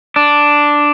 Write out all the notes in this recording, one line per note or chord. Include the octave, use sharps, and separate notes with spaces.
D4